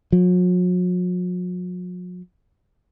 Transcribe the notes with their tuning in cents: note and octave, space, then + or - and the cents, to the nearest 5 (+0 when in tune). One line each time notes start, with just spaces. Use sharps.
F#3 -45